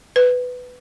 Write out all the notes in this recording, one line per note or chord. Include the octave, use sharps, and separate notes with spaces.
B4